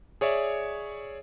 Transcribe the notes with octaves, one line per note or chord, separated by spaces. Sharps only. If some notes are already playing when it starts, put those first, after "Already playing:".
G#4 C#5 D5 E5